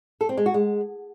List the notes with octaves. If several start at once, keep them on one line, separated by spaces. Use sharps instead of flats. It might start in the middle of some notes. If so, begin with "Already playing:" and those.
A4
C4
G#3
F#4
G#3